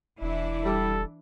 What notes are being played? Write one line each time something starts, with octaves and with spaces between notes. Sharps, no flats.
E1 E3 D4 E4
G3 A4